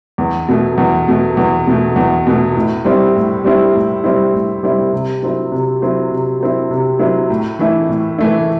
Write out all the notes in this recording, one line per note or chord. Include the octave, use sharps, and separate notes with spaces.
E2
B2 A3
E2
B2 A3
E2
B2 A3
E2
B2 A3
A2
G3 C4 E4
A2
G3 C4 E4
A2
G3 C4 E4
A2
G3 C4 E4
C3
F#3 C4 E4
C3
F#3 C4 E4
C3
F#3 C4 E4
C3
F#3 C4 E4
A2
E3 A3 E4
A2
E3 A3 E4